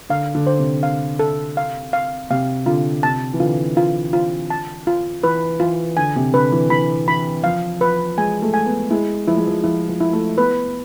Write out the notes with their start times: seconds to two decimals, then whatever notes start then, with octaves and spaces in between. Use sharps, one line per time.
0.09 D3 F5
0.35 D3
0.47 C5
0.59 C3
0.83 F5
1.19 A4
1.57 F5
1.93 F5
2.30 C3 F5
2.66 D3 F4
3.03 C3 A5
3.33 E3
3.40 D3 F4
3.77 F4
4.13 F4
4.50 A5
4.87 F4
5.23 E3 B4
5.60 E3 F4
5.97 D3 G#5
6.16 C3
6.34 D3 B4
6.52 E3
6.70 E3 B5
7.08 E3 B5
7.44 F3 F5
7.80 F3 B4
8.17 G#3 G#5
8.42 A3
8.54 G#5
8.66 B3
8.91 G#3 E4
9.28 F3 E4
9.37 G#3
9.47 F3
9.64 F3 E4
9.89 F3
10.00 E4
10.13 A3
10.37 B3 B4